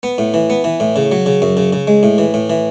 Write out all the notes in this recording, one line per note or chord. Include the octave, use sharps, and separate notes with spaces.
B3
A2
E3
B3
E3
A2
C#3
F#3
C#3
F#2
C#3
C#3
G#3
A2
E3
A2
E3